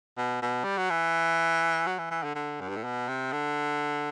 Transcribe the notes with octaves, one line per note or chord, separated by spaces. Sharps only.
B2
B2
G3
F#3
E3
F#3
E3
E3
D3
D3
F#2
G2
A2
B2
C3
D3